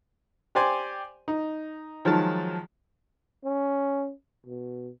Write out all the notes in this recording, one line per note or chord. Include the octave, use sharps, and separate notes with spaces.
G4 C5 D5 G#5 C6
D#4
D#3 F3 F#3 G#3 A5
C#4
B2